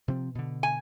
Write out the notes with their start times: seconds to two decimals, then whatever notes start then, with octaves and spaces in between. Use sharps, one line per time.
0.08 C3 F3 C4
0.35 B2 D3
0.63 G#5